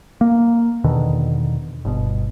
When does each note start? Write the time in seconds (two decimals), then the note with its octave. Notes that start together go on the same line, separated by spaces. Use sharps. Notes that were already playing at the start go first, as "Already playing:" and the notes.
0.21 A#3
0.84 E2 B2 D3 D#3
1.85 G1 B2